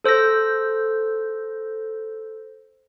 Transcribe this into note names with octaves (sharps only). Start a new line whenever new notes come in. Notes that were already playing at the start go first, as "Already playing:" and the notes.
A4 C5 E6 G6 A#6